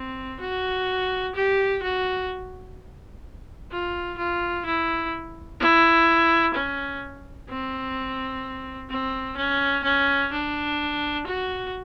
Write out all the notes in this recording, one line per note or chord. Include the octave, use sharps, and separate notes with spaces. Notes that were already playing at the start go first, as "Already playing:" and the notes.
Already playing: C4
F#4
G4
F#4
F4
F4
E4
E4
C#4
C4
C4
C#4
C#4
D4
F#4